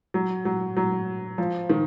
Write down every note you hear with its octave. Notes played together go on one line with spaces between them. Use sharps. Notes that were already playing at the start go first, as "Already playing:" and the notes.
F#3
F#3
F#3
F3
D#3